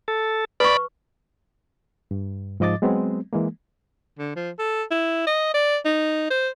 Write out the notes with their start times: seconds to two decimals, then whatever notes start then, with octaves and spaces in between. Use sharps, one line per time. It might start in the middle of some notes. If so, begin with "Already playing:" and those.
0.08 A4
0.60 B4 D5 B5 C#6
2.11 G2
2.60 G#2 F3 D#5 D6 A6
2.82 F#3 G#3 B3 C4
3.33 E3 G#3 A#3
4.19 D3
4.36 F3
4.59 A4
4.91 E4
5.27 D#5
5.54 D5
5.85 D#4
6.30 C5